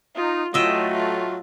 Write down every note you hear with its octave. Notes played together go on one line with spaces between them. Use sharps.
D#4 F4
A2 F#3 A3 F4 D#5 E5 G5
F4